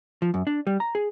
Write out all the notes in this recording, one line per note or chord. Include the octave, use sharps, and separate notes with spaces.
F3
F#2
D4
G3
A#5
G#4